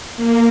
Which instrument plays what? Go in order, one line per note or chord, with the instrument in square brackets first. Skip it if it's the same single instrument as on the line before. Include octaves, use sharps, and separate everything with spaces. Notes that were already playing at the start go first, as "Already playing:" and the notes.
[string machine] A#3